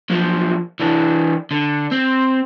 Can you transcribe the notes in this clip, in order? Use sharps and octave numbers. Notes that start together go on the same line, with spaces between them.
B1 F3
E3 D4
D3
C4